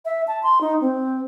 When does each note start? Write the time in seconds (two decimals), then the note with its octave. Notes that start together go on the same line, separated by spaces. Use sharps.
0.05 E5
0.28 A5
0.43 C6
0.61 D#4
0.81 C4